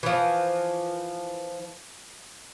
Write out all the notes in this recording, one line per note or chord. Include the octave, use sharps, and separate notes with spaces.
E3 F3